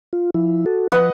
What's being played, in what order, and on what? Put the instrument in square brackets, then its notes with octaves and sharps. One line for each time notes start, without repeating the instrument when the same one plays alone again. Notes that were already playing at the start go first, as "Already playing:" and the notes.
[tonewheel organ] F4
F3 E4
F#4 A4
[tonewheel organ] F3 [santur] B4 D#5 F#5